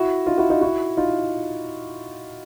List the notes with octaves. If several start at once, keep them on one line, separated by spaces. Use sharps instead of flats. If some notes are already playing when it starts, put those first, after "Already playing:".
Already playing: E4 F#4
D#4 F4
E4 F#4
D#4 F4
E4 F#4
D#4 F4